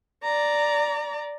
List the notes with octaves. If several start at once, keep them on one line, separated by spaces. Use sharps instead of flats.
D5 A#5